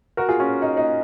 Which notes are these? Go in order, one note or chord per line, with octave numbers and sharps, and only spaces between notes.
F#4 A#4
F4 G#4
C#4 F4
D#4
D#4